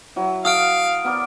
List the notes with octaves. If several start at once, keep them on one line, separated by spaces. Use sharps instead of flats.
F#3 E4
F#4 A4 F5 D#6 F6 D7
B3 A#4 D5